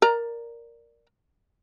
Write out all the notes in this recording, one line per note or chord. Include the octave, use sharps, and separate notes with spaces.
A#4 D5 A#5